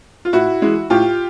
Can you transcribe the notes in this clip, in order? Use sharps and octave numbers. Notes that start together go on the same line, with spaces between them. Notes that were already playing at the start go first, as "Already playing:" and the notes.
F4
A2 E4 F#4
E3 G#3
A2 F4 G4